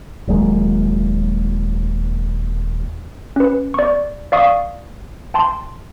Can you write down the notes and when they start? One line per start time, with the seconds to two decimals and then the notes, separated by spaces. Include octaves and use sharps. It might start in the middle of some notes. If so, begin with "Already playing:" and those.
0.27 D#1 F#3 G#3 A#3
3.36 C#4 B4
3.74 D5 C#6
4.32 D5 F5 C#6 D#6
5.34 G5 A5 C6